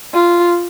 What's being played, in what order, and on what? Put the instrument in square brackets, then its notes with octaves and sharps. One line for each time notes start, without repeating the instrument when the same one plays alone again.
[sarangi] F4